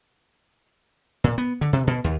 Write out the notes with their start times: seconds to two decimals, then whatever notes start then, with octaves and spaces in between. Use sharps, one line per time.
1.24 A#2
1.38 B3
1.61 D3
1.73 C3
1.87 B2
2.04 D#2